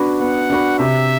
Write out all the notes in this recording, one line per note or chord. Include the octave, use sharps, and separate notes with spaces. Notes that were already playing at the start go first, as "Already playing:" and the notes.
Already playing: B3 D4 F#4 B4
B3 F#5
D4 F#4 B4
C3 E5